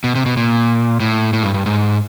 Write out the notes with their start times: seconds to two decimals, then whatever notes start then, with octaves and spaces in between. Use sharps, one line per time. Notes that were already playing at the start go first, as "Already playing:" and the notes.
0.04 B2
0.15 C3
0.26 B2
0.37 A#2
1.00 A2
1.33 A2
1.43 G2
1.54 G2
1.66 G#2